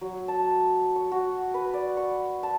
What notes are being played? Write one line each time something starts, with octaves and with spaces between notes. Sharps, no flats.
F#3
A5
C#6
F#4
B4
D5
C#6
A5